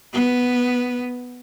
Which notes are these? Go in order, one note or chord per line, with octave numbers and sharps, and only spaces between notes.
B3